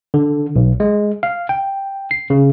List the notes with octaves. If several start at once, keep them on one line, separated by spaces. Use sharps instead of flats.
D3
B1
G#3
F5
G5
C7
C#3